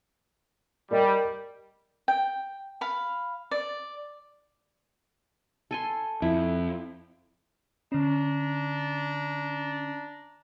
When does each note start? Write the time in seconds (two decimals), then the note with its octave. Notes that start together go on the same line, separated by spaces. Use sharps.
0.91 G3 A#4 D5 D#5
2.08 G5
2.81 F5 B5
3.51 D5
5.71 A4 G#5 C6
6.22 F2 E4
7.92 D3 C#4 D4 A#5